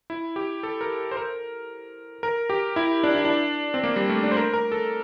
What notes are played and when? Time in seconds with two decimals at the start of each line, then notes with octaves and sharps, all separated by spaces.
0.10 E4
0.36 G4
0.63 A4
0.81 A#4
1.11 C5
1.17 A#4
2.23 A#4
2.50 G4
2.76 E4
3.03 D4
3.15 E4
3.25 D4
3.74 C4
3.83 A#3
3.96 G3
4.09 A3
4.23 D4
4.32 C5
4.37 A#4
4.54 A#4
4.72 A4